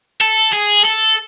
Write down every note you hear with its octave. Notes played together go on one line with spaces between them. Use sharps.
A4
G#4
A4